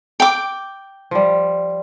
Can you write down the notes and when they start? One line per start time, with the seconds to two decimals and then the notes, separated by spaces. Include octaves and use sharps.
0.20 G5 D6
1.11 F3 G3